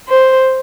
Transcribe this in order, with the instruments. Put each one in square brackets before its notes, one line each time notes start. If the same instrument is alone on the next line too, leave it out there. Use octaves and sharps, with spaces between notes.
[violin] C5